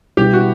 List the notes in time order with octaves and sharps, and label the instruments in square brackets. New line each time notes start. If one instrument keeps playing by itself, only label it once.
[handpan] B2 G3 B3 E4 [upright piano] G4
[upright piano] F#4